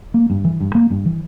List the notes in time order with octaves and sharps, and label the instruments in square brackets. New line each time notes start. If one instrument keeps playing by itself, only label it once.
[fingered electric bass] A#3
G2
E3
G2
A#3
G2
E3